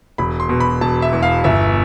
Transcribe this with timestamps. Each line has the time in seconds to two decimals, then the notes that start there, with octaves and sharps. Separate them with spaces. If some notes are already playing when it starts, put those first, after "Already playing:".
0.18 E1 B5
0.40 C6
0.49 B2
0.60 B5
0.81 E1 A5
1.02 E5
1.13 E2
1.23 F5
1.44 G1 E5